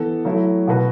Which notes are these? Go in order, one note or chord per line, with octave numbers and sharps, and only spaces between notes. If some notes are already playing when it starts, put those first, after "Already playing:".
Already playing: E3 B3 A4
F#3 A3 E4
B2 B3 F#4 B4